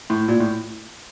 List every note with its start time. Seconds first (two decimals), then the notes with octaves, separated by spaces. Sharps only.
0.10 A2
0.28 A#2
0.40 A2